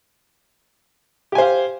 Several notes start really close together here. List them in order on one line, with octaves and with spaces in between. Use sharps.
G4 G#5 C5 F5